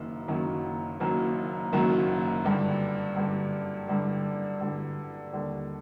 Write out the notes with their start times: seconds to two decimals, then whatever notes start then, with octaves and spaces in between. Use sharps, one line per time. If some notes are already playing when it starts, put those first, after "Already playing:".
Already playing: F#1 F#2 D#3 F#3 A#3
0.28 F#1 F#2 D#3 F#3 A#3
1.00 F#1 F#2 D#3 F#3 A#3
1.73 F#1 F#2 D#3 F#3 A#3
2.44 G2 D3 G3
3.16 G2 D3 G3
3.88 G2 D3 G3
4.61 G2 D3 G3
5.32 D#2 D3 G3